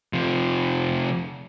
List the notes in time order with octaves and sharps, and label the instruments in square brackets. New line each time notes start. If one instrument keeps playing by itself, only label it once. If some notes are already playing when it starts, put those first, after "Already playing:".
[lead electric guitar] C3 F3